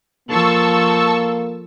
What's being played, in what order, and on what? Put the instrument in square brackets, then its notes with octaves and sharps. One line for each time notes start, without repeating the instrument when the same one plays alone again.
[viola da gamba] F3 A4 [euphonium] A#3 [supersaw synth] A5 C#6 E6